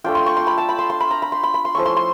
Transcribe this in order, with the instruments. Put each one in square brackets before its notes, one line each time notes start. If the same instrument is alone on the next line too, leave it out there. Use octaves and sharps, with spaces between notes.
[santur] A3 D4 F4 G5
C6
C#6
C6
B5
A5
B5
C6
C6
B5
A#5
B5
C6
B5
B5
C6
F3 A3 C#4 E4 C#6
C6
C6